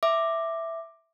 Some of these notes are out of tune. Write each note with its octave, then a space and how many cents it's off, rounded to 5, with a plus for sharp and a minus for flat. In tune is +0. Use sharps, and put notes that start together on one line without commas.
E5 +0 D6 +10